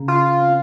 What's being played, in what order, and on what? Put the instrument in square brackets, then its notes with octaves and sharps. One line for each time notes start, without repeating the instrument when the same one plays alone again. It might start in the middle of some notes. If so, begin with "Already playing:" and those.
Already playing: [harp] C#3 A#3
[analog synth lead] F4
[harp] C4